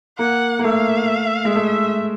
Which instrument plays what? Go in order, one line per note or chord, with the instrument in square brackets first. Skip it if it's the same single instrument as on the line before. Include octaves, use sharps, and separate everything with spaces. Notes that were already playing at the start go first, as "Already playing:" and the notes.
[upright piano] A#3 [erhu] F#5
[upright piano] A#3
[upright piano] A3 [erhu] F5
[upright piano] G#3
[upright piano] A3 [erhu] E5